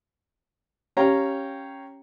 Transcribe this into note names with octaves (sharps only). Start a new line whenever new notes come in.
C#4 G4 C#5 F5 G5 A#5